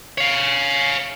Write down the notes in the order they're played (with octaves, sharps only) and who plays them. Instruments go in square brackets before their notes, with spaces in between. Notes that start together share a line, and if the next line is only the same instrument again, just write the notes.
[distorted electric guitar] C#5 F5